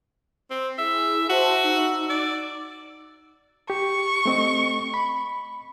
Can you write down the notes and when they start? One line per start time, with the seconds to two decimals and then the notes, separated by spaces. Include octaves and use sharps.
0.50 C4
0.78 E4 G#4 E5
1.29 F#4 C5 E5 A5
1.64 D#4 E6
2.10 D5
3.70 G4 C#6
4.26 A3 C4 D#5
4.94 B5